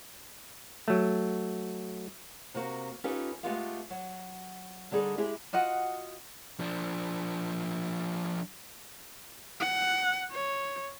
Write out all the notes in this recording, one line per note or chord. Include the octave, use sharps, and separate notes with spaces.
F#3 A3
C3 A#3 F#4
C#4 D#4 F4 G4 A4 B4
G#3 A3 B3 F4 G4 F5
F#3
D3 G3 D#4 G#4 A4
G#3 E4 G4 G#4
F4 F#4 D#5 F#5
F3 D4
F#5
C#5